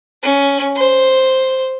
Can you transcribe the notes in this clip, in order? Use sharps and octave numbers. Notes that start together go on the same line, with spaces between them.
C#4
C5